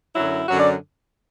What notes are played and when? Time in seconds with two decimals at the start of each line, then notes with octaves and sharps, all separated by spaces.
0.16 F#2 D3 F#3 E4
0.48 F#2 D3 F#3 F#4
0.59 D5